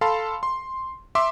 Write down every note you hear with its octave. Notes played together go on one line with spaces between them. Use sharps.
A4 F5 A5 B5 C6
C6
E5 C6 D6